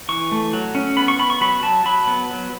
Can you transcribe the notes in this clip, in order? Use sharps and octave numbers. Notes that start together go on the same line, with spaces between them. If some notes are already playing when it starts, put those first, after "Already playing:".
E3 C#6
A3
F#3
C#4
B3 B5
C#6
B3 B5
C#6
F#3 B5
F#3 A5
F#3 B5
B3
F#3